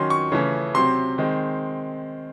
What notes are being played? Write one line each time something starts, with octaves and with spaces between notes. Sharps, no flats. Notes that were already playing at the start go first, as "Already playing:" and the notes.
Already playing: D#3 F#3 C#4 C6
C#6
C#3 E3 A3 C#4
C3 F#3 C4 C6
D#3 G#3 C4